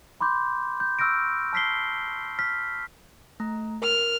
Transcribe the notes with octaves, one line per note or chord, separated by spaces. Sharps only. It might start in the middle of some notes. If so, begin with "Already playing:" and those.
B5 C6 D6 G6
G6
C#6 E6 F6 G6 A#6 D7
A5 F6 B6 C7 G7
F6 B6
A3 A#5
A#4 F6